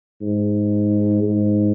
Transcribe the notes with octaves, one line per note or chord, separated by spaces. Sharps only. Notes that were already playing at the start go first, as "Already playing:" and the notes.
G#2
G#2